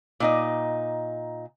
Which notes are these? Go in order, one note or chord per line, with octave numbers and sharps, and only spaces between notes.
A#2 D#4 D#5